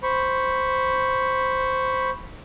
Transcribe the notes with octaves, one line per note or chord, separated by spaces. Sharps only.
C5 B5 C#6